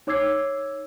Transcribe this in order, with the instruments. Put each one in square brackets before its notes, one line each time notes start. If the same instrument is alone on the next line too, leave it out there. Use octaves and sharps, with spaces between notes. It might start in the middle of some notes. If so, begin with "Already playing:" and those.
[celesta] D#4 C#5 D6 E6 G#6 C7